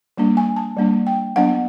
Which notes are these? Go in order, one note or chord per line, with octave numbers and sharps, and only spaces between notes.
G3 A#3 D4
G#5
A5
G3 A#3 D4
G5
F#3 B3 D4 F#5